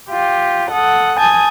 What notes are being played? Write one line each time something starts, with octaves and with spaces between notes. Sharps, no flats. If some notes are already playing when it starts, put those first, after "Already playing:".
F4 G4
A4 F#5 D#6
G#5 A5 D#6 G6 G#6